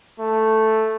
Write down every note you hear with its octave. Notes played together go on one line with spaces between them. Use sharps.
A3